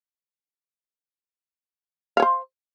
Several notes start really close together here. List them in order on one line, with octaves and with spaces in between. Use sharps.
F5 C#5 C5